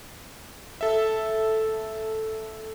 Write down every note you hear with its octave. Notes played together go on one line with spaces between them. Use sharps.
A4 E5